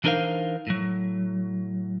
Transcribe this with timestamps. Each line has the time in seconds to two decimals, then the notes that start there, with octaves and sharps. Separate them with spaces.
0.04 E3 D4 D#4 A#4 C5 F5
0.67 A2 F#3